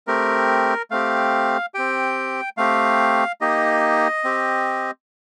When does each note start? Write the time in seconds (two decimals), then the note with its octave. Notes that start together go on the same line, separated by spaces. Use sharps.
0.07 A3 C4 G4 A#4
0.91 A3 C4 G4 F5
1.74 C4 G4 G5
2.57 A3 C4 G4 F5
3.41 A#3 D#4 G4 D#5
4.24 C4 G4